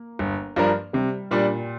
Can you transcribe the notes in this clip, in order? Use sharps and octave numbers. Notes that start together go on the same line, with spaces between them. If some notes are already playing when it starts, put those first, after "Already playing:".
Already playing: A#3
G1
G2 F3 D4 A#4
C3 G3
A#2 G3 D4